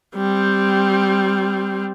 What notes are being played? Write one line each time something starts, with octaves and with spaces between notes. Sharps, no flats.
G3 C4